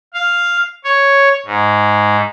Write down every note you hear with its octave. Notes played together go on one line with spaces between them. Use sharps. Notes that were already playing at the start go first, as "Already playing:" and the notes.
F5
C#5
G#2